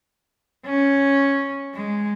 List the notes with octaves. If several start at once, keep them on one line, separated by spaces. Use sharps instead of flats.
C#4
G#3